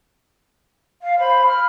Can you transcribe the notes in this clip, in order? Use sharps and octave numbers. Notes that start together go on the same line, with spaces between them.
F5
C5 B5
F6